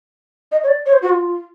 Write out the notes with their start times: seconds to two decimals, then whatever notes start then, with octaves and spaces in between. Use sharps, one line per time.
0.52 D#5
0.63 C#5
0.68 D5
0.86 C#5
0.93 C5
1.02 F#4
1.10 F4